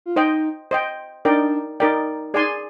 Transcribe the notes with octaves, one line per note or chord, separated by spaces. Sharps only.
F4
D#4 C5 D#5 G5
C5 D#5 G5
D4 D#4 A#4 D5 G5
D#4 A#4 D5 G5
D#4 G#4 D5 G#5 C6